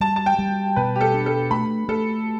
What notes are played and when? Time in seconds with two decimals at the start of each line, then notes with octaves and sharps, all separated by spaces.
0.01 G3 A5
0.16 A5
0.26 G5
0.39 G3
0.76 B2 B4
0.96 G4
1.01 A4
1.14 D4
1.26 A4
1.51 A3 B5
1.89 A3 A4